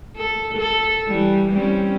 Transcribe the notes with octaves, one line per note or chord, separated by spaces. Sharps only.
A4
A4
E3 G3
G3 C4 C#4